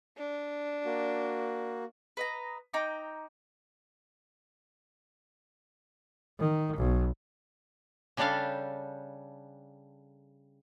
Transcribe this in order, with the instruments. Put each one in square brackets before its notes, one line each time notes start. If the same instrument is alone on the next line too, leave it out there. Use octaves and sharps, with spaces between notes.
[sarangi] D4
[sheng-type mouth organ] A#3 F#4
[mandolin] B4 D#5 A#5
D#4 G5 A#5 D6
[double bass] D#3
B1
[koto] C#3 G3 D4 G4 A4 F5